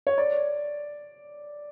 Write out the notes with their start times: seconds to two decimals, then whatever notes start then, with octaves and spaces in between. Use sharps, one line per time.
0.07 C#5
0.18 D5